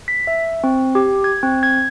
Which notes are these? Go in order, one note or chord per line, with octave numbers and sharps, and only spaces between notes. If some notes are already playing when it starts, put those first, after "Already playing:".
B6
E5
C4
G4
G#6
C4
G#6